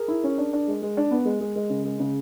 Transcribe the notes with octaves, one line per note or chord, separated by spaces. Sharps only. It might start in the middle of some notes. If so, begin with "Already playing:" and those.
Already playing: G#4 A#4
E4
C#4
D4
D4
G#3
G#3
D4
B3
G#3
G#3
G#3
C#3
G#3
C#3